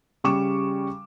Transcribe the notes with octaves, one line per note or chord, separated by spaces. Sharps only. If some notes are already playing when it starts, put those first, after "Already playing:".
C#3 G3 C#6 D6 E7